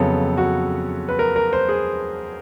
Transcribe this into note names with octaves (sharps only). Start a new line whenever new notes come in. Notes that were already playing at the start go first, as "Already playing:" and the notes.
Already playing: F2 C#3 F#3 B3 A4
F#4
B4
A#4
A#4
C5
G#4